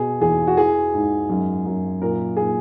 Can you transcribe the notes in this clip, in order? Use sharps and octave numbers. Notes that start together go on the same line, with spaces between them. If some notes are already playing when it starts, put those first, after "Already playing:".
Already playing: B2 G#4
E2 G#4
F#4
E3 G#4
G#2
F#2
F#2
A#2 A#4
A#2 G#4